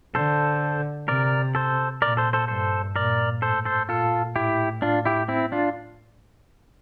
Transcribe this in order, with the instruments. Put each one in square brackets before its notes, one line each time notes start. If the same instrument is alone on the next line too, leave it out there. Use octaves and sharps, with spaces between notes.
[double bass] D3 [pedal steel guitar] A4 C5
[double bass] C3 [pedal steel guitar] A#4 D5
[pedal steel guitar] A4 C5
[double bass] A#2 [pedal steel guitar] A#4 D5
[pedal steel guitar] A4 C5
A4 C5
[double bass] G2 [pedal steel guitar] A4 C5
[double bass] A#2 [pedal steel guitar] A#4 D5
[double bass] A2 [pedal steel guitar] A4 C5
[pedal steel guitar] A4 C5
[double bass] A#2 [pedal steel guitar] F4 A4
[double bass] A2 [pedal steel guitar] E4 G4
[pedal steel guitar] D4 F4
E4 G4
C4 E4
D4 F4